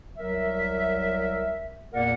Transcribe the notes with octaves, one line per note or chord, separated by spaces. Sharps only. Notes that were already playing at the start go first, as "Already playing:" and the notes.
C2 F#3 A#4 E5
E2 A#2 A#3 A#4 D5 F#5